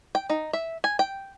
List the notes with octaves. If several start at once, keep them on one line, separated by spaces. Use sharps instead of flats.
G5
D#4
E5
G#5
G5